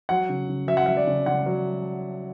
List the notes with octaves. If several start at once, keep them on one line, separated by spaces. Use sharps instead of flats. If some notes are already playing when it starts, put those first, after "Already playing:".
F#3 F#5
C#3
C#3
F#3 E5
F#5
F#3 E5
D5
C#3
C#3 F#5
F#3